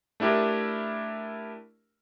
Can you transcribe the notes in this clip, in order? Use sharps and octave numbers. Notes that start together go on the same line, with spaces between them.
A3 D4 E4 G4 A#4